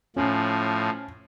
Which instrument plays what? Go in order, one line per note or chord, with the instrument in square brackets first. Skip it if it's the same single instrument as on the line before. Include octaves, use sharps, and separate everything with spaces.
[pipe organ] A2 F3 [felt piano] C#4